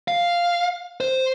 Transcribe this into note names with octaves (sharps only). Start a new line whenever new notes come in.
F5
C5